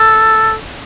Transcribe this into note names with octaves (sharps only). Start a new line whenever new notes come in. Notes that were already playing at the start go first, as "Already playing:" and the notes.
Already playing: A4